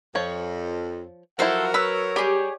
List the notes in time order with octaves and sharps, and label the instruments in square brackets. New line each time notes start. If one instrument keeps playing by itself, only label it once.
[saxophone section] F2 [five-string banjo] F3 C#5
[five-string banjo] F3 E4 [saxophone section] F#3 A#4 [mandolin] A4 C5 [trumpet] F#5
[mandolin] B4 E6 [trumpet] C#5 [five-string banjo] B5
[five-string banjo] G3 [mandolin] G4 G#4